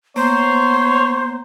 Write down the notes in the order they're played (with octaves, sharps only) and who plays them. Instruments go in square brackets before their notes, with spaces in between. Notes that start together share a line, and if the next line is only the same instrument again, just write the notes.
[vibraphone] A#3 [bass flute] B3 [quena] C5 [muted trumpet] C#5